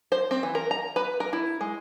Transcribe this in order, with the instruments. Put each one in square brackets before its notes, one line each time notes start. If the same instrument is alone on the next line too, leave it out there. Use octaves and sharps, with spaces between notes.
[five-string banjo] C5
C4
E3
A#4
A#5
B4
A#4
E4
G#3